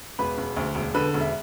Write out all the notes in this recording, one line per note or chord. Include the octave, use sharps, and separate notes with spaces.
E1 B4 B5
E1
D2
E1
D3 B4 B5
E1
E5